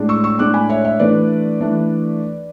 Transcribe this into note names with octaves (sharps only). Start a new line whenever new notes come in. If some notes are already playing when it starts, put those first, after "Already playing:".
Already playing: A2 G#3 D4
C#6 E6
C#6 E6
A2 G#3 D4 D6 F#6
G#5 B5
C#5 E5
C#5 E5
E3 A3 D4 B4 D5
E3 A3 D4